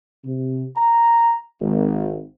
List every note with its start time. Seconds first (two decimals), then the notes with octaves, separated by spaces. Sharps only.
0.24 C3
0.75 A#5
1.60 G#1